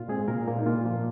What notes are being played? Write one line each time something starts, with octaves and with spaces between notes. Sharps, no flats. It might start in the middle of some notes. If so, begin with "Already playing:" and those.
Already playing: A#2 F4
G#3 C4 G#4
A#2 A#3 A#4
A#3 F4
D#4
A#2 F4
F3 A#3